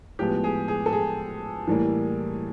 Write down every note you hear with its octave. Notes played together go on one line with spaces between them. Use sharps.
A2 F3 G#3 B3 G4
G#4
G#4
A4
G#4
A2 E3 G3 A#3